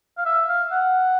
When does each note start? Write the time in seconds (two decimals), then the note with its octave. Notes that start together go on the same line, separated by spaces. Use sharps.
0.18 F5
0.25 E5
0.49 F5
0.72 F#5